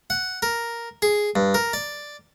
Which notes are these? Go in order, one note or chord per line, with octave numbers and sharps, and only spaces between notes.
F#5
A#4
G#4
G2
A#4
D5